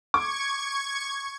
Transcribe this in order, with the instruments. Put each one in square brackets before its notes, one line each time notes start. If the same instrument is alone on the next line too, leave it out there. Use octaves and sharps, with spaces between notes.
[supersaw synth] C#6 G#6 [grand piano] D6